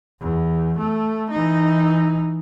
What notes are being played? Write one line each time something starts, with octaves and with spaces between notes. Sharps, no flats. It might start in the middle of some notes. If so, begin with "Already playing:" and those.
E2
A3
E3 D#4